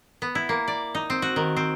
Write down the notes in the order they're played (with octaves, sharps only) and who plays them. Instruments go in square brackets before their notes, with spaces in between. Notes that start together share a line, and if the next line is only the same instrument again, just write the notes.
[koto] B3
E4
A#3
D5
D#4
C4
F#4
D#3
C4